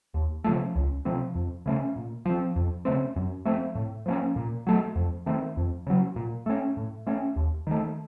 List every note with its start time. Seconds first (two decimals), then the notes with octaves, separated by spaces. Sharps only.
0.14 D#2
0.44 C#3 F3 A3
0.76 C#2
1.05 C3 F3 C4
1.35 F2
1.66 C#3 A3 C#4
1.96 A#2
2.25 F3 C4
2.56 F2
2.85 C#3 A3 C4
3.16 F#2
3.45 F3 A3 C4
3.75 A2
4.06 F3 A#3 C#4
4.36 A#2
4.67 F#3 A3
4.96 F2
5.26 D#3 A3 C4
5.57 F2
5.87 C#3 F#3
6.16 A#2
6.46 A3 C#4
6.77 A2
7.07 A3 C#4
7.36 D#2
7.67 D#3 A3